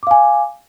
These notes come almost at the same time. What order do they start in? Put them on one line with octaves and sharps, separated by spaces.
D6 F5 G#5